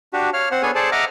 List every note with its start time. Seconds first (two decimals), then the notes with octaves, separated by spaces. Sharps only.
0.13 D4 F#4 G4
0.33 C#5 F5 F6
0.51 C4 C5 F#5
0.63 B3 D4 G#4 A4 C#5 G#5
0.75 G#4 A4 C5 D5 A5
0.92 D#5 E5 F#5 A#5 D6 F6